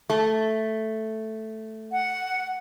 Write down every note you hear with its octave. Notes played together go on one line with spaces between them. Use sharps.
A3
F#5